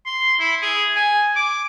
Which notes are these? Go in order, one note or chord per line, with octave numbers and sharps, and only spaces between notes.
C6
E4
G#4
G#5
D6